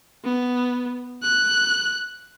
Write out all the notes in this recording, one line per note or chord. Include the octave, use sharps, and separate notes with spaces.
B3
F#6